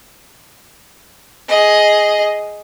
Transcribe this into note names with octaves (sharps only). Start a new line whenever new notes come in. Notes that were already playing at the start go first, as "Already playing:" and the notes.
G#4 D#5